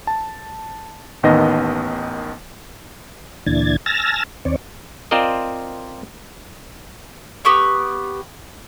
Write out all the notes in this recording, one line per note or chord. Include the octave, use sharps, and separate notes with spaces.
A5
A1 D#2 D#3 B3 D#5 A#6
D2 A#2 E3 D4 G#6 A6
G#5 A5 E6 F6 A6 A#6
D#2 C4 C#5 D5
C4 F4 A#4 C5 D5 D#5
B3 G4 C#6 E6